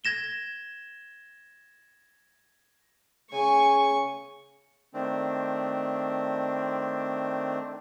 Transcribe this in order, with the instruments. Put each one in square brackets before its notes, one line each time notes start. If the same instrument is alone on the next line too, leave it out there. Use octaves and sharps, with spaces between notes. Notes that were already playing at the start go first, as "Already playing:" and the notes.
[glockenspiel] G#6 A#6 E7 G7
[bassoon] C#3 [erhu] G#5 [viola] C#6
[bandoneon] D#3 A3 C4 D4